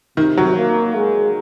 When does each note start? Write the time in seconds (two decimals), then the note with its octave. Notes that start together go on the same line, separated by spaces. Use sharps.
0.17 C3 D#3
0.37 F#3
0.56 A#3
0.95 G#3